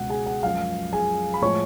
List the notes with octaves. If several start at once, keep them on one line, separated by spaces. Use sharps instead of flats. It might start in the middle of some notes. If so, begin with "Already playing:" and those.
Already playing: C#2 B2 G#3 F#5
G#4 G#5
F#5
F#2 F3 G#3 F5
G#4 G#5
B5
A2 F3 G#3 C#5 C#6